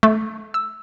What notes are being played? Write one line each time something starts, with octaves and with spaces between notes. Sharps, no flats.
A3
E6